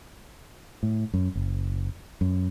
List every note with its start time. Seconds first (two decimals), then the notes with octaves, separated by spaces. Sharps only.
0.83 A2
1.14 F#2
1.35 F#1
2.21 F#2